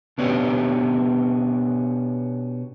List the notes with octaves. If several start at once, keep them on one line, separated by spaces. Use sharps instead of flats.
B2 B3 C#4 D4 G4